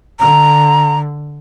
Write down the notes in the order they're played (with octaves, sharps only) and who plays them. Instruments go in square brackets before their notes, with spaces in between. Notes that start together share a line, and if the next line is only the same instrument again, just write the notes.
[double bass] D3 [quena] A#5